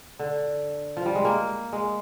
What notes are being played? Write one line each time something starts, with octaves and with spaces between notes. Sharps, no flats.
D3
F3
G3
G#3
A#3
G#3